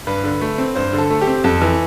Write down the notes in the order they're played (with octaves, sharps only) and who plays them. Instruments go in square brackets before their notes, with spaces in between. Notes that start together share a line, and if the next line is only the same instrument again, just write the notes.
[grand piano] G2 B4
D3
A3
C4
G2 C5
D3
A4
A3
G4
C4
F2 A4
E3